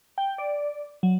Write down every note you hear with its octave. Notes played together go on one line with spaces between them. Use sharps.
G5
D5
F#3